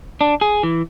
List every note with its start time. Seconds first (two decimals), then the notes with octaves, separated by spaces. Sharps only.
0.21 D4
0.41 G#4
0.63 E3